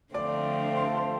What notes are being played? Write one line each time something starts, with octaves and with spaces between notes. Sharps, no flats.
D3 F3 A3 C4 F4 D5 D6
C5 C6
A4 A5
C5 C6